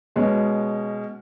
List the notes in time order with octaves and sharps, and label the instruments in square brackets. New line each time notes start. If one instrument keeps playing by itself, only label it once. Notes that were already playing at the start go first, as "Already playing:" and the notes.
[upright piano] B2 G#3 C#4